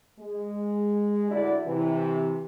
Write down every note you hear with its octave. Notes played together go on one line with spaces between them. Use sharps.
G#3
D2 A2 D4 E4 F#4 D5
C3 E3